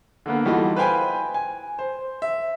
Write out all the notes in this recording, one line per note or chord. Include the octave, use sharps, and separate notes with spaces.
D3 A#3 B3
E3 G3 D#4 F4 F#4 A4
B4 C5 F5 G5 G#5 B5
G#5
C5
E5